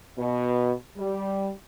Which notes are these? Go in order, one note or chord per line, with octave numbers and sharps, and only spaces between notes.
B2
G3